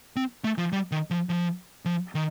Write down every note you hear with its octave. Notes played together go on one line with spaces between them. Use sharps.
C4
A3
F3
G3
D#3
F3
F3
F3
D#3